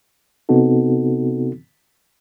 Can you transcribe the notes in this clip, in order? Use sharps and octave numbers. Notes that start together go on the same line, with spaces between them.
C3 B3 C4 D#4 F#4 A4